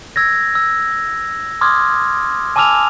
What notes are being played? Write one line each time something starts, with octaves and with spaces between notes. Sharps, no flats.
E6 G#6 A#6
E6
C6 D6 D#6 F6 G#6
G#5 A5 D6 E6 F6 F7